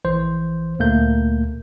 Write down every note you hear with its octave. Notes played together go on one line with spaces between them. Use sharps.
A#1 E3 C5
D2 A#2 A3 A#3 G6